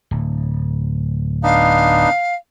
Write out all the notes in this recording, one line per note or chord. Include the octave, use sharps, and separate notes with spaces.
D1
B3 D4 D#4 F5